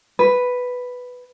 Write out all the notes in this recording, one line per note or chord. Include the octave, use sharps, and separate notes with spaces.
B4